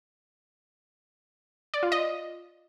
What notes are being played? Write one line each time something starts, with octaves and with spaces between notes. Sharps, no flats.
D5
F4
D#5